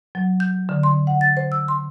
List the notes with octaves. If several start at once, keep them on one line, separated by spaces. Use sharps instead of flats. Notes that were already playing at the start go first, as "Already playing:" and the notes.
F#3
G6
D3
C6
F#5
A6
C5
E6
C6